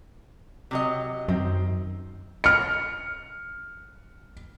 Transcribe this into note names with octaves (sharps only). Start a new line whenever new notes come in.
C3 F#3 D#5
F#2 D#3 C4
F6 C#7